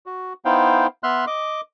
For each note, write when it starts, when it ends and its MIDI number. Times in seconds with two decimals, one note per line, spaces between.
0.06 0.33 66
0.45 0.87 59
0.45 0.87 63
0.45 0.87 64
0.45 0.87 72
0.45 0.87 77
0.45 0.87 79
1.03 1.25 59
1.03 1.25 76
1.03 1.25 84
1.03 1.25 89
1.03 1.25 90
1.27 1.61 75
1.27 1.61 86